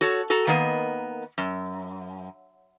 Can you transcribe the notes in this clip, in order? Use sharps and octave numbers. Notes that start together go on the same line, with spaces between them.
F#4 A4 C#5
F#4 A4 A#5
D#3 A#3 B3 D#5
F#2